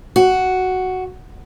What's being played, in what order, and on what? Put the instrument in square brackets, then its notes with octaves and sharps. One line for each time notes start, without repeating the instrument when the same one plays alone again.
[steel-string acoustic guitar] F#4